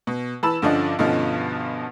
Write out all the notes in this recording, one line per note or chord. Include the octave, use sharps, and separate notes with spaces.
B2
E3 A5 B5 E6 E7
G2 D3 F3 C#4 D4 D#5
G2 B2 D3 F3 C#4 D#4